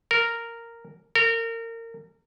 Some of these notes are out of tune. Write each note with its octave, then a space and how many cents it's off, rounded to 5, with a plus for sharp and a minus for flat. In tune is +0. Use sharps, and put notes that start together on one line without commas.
A#4 -10
A#4 -30